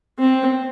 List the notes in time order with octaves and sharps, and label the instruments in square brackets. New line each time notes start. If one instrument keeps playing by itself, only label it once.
[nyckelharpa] C4